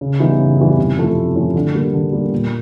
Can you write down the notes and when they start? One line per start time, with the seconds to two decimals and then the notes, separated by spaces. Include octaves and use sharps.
0.01 C#3
0.20 E3 G3 B3 D#4
0.39 C#3
0.58 E3 G3 B3 D#4
0.79 C3
0.97 F3 A3 C#4 E4
1.16 C3
1.35 F3 A3 C#4 E4
1.56 D3
1.75 G3 A#3
1.94 D3
2.12 G3 A#3
2.33 A#2